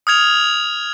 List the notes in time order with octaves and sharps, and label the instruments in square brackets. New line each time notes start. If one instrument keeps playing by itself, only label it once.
[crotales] D#6 F6 G#6 F7